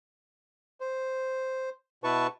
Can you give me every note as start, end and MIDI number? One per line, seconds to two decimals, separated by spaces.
0.80 1.69 72
2.04 2.27 47
2.04 2.27 64
2.04 2.27 71
2.04 2.27 81
2.04 2.27 85